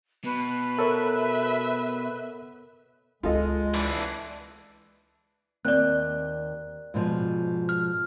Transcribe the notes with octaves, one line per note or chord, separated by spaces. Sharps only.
B2 B4
A4 A#4 C#5 E5
C#2 G#3 A#3 F4 A4 D#5
E3 D4
D#2 C4 D5 F#6
G#2 B2 F3
F6